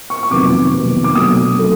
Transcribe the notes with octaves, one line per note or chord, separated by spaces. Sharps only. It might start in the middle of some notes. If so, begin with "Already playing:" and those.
C#6
C#6
F2 C3 D#3 F#3 B3 D6
F2 C3 D#3 F#3 B3
D6
B2 F#3 A3 D4 D#6
F#3 A3 D4